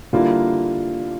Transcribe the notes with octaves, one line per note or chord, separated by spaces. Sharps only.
D3 G3 A#3 E4 F4